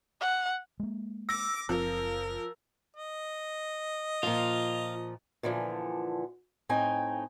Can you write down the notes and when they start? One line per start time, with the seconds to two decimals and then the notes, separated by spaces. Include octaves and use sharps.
0.21 F#5
0.80 G#3 A#3
1.29 D6 E6 A#6
1.69 F#1 F3 C4 A#4
2.96 D#5
4.23 A#2 F3 F4
5.43 A#2 D3 E3 F3
6.69 A2 C4 D#4 G5 G#5